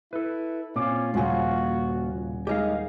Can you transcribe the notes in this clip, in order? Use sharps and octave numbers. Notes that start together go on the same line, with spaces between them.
E4 A4 B4
A#2 C4 C#4 F4 D6
D#1 C#3 F3 F#4 F#5 G#5
G#3 D#4 G4 G#4 A#4 F5